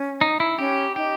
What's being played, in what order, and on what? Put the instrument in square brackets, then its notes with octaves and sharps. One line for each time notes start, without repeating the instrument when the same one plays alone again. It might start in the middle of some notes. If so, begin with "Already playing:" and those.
Already playing: [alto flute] C#4
[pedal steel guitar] D#4
E4
[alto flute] C#4 [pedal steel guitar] G4
[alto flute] D#4 [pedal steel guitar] G4